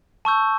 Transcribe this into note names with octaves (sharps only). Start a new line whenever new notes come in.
A5 C#6 E6 G6